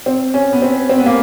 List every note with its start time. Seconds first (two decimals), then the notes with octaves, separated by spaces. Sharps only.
0.06 C4
0.34 C#4
0.52 B3
0.62 C4
0.89 C4
0.98 B3
1.06 A#3